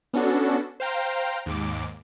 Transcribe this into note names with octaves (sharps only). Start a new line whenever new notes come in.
B3 C#4 D4 F#4 A4
C5 F5 G5 A#5
D#2 G#2 D6